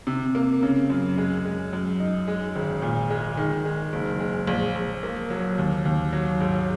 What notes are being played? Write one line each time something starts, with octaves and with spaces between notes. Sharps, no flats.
C3
A#3
C#3
F#2
G#3
G#3
F#2
D#4
G#3
G#1
A#2
G#3
D#3
G#3
F#1
G#3
A#1
A#1
A#3
F#3
D#2
D#2
F#3
G#2